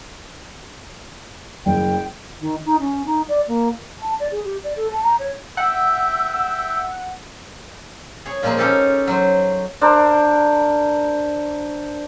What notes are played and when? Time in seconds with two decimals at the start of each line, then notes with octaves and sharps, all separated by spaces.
1.66 F#1 G5
2.40 D#3
2.65 D#4
2.79 C#4
3.06 D#4
3.28 D5
3.48 A#3
3.99 A5
4.19 D5
4.31 G#4
4.44 G4
4.64 D5
4.76 A4
4.90 A5
5.03 A#5
5.19 C#5
5.57 E5 F#5 G5 E6
8.25 G#4 C#5
8.43 A#2 F3 G#3 A#3 C4
8.58 C#4 D#4 G4 A4 F5
9.07 F#3 C5
9.81 D4 A#4 C5